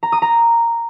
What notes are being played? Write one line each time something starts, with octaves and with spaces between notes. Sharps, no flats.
A#5
D#6
A#5